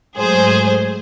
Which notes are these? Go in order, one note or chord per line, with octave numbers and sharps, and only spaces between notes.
G#2 F#3 A3 G#4 C5